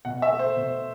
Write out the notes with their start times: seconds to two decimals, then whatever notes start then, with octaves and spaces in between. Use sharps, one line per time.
0.05 B2 F#5
0.22 E5
0.31 A3
0.39 C5
0.56 B2